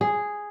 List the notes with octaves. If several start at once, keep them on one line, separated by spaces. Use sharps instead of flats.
G#4